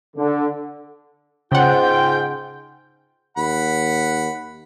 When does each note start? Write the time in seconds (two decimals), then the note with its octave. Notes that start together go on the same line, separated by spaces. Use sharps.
0.17 D3
1.52 G#2 C#3 F4 F#5 G5
3.37 D#2 F#5 B5